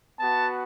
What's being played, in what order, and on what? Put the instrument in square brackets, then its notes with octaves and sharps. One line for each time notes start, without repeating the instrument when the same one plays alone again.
[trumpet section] B3 F#4 A5